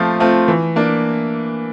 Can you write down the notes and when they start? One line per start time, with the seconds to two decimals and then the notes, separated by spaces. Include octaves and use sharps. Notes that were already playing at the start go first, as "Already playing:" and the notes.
Already playing: F3 A3 C4 F4
0.20 A3 C4 F4
0.48 E3
0.76 A#3 D4